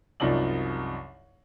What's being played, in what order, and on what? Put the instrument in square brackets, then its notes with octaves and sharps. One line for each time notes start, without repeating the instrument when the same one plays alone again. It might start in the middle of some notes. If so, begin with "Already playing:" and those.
[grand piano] C2 F#2 F3 D#4 D5 F#7